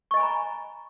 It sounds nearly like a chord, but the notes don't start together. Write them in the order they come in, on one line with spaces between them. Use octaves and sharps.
C#6 D#5 G#5 B5 A#5